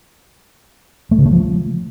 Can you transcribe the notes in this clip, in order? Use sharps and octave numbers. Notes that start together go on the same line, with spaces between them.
A3
C#3
A3
F3